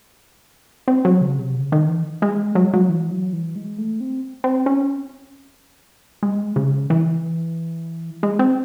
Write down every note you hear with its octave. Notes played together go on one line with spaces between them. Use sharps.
C4
F#3
C#3
C3
C#3
D#3
E3
G#3
F#3
G#3
F#3
E3
F#3
E3
G#3
A3
C4
C4
C#4
G#3
C#3
E3
G#3
C4